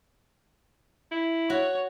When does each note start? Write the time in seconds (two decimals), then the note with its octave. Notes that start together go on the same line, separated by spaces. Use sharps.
1.12 E4
1.50 F#4 C#5